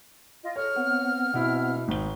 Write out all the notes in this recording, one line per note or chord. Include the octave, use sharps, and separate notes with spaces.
F4 D#5
A4 C#5 F6
B3 C4 F#5
B2 E4
G#1 G7